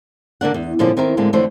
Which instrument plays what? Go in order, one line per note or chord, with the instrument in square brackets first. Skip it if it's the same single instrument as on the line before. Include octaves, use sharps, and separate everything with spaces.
[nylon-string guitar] D3 A#3 D4 F#5
E2
A#2 D3 F3 G3 A#3 C#4
D#3 C4 E4 A#4
A2 D3 G#3 A#3 C4
F2 D3 E3 A3 C5 C#5